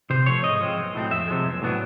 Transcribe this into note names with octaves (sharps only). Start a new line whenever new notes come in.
C3 C5
F3 A3 C#5
G#2 D#5
F3 G#3 C4
B1
A2 F#3 A3 C4
F2 E5
C3 F3 G#3
B1
A2 F#3 B3 D4